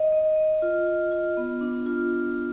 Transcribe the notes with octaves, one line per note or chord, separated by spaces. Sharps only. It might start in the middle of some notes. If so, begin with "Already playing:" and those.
Already playing: D#5
D#5
D#5
F4
F4
F4
B3
D4
F4